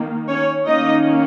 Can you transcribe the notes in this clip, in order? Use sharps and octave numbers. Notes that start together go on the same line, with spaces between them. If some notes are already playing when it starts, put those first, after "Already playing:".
Already playing: D#3 A#3
C#4 C#5
D#3 A#3 C#4 D#4 D#5